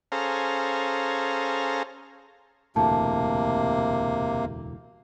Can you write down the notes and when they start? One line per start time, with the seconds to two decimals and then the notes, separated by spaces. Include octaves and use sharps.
0.12 C#4 G#4 A4 C5 F5 A#5
2.76 E1 D2 A2 C3 A#3 A5